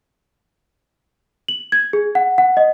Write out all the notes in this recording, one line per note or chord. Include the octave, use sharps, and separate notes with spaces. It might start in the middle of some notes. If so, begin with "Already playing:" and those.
F#7
G#6
G#4
F#5
F#5
D#5